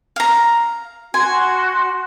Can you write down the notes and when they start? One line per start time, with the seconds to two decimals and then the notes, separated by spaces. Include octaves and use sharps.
0.16 F5 A#5
1.14 F#4 G#5 C6